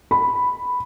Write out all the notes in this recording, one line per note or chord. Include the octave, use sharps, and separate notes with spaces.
B5